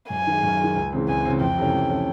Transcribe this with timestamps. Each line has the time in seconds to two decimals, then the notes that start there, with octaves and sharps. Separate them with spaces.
0.10 F#2 G#5
0.27 D#3 G#3
0.43 F#2
0.59 D#3 G#3
0.76 C#2
0.93 C#3 E3 G#3 C4
1.08 C#2 G#5
1.25 C#3 E3 G#3 C4
1.41 F2 G5
1.58 C3 E3 A3 C#4
1.74 F2
1.90 C3 E3 A3 C#4